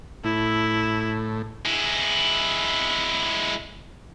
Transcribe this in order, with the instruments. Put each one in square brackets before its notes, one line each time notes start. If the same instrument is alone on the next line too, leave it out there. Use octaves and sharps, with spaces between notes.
[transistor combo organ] A2 [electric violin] E4
[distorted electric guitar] G#3 E4